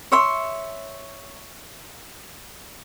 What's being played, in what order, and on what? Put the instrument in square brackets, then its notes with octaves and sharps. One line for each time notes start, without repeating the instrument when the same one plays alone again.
[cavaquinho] C#5 E5 C6